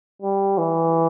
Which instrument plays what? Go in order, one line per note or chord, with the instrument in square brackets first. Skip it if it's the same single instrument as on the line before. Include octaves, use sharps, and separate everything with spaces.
[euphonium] G3
E3